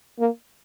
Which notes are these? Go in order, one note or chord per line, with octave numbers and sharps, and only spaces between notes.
A#3